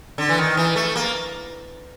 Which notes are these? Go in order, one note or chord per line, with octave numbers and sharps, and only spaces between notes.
D3
E3
D#3
E3
A3
A#3